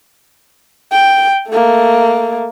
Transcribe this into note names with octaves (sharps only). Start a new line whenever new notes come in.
G5
A3 A#3